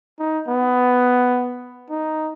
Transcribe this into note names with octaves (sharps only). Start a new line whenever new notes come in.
D#4
B3
D#4